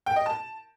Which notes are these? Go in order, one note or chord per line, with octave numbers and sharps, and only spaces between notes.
G5
D#5
A5